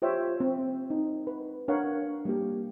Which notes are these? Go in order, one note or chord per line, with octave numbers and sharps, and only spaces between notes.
F4 G4 C5 C#5 E5 G5
C4
D#4
B4
D4 A#4 C#5 F5 F#5
G3 A#3 G4